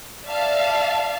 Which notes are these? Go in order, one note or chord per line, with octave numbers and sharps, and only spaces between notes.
D5 E5 F5 A5